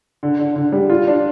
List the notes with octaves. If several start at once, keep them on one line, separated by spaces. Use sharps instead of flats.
D3
D3
D3
G3
F4
D4